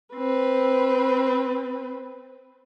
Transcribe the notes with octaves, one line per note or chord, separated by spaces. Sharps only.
C4 B4